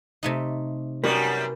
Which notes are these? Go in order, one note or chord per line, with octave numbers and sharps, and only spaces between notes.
C3 A3 D#4
F#2 G3 F#4 A#4 B4